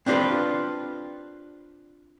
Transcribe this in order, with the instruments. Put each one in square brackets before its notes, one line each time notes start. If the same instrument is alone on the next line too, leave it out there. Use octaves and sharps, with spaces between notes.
[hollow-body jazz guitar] C4 D4 F4 G4 A4 B4